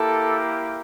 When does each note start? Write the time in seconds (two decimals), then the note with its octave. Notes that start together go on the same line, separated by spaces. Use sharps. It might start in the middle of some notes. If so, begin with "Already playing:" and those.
Already playing: A#3 E4 G4 A4